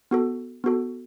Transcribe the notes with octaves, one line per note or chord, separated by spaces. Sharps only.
B3 F#4 A4
B3 F#4 A4